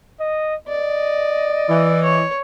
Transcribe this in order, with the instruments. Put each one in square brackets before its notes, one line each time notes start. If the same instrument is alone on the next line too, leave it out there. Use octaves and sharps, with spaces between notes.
[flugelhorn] D#5
[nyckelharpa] D5 [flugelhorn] D#5
[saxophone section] E3
[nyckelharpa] C#5